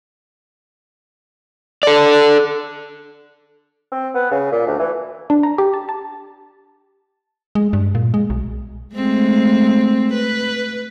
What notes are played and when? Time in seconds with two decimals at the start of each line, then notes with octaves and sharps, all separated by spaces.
1.83 A4 D5
3.92 C4
4.14 B3
4.31 C#3
4.52 A#2
4.67 D2
4.79 E3
5.30 D4
5.43 A#5
5.58 G4
5.74 A5
5.89 A5
7.55 G#3
7.73 G2
7.95 A#2
8.14 G#3
8.30 B1
8.94 G#3 A3 C4
10.13 B4